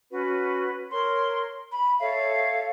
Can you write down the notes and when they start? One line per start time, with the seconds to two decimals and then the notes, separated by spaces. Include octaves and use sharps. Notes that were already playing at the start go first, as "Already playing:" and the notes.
0.11 C#4 F#4 B4
0.91 A#4 C#5 C6
1.72 B5
1.99 A4 C#5 E5 F5